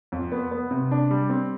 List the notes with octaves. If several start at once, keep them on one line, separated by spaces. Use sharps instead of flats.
F2
B3
B3
C3
D4
G3
C4